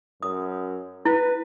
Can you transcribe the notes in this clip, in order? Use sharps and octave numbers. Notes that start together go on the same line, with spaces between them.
F#2 D#6
E4 B4